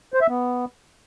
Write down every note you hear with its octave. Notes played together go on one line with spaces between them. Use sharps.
C5
E5
B3